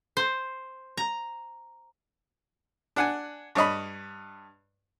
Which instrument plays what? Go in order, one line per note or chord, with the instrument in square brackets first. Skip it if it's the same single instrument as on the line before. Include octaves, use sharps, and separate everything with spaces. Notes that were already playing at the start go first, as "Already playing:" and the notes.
[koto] C5
A#5
[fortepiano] D4 F#5 G#5
G2 C#5 D#5 B5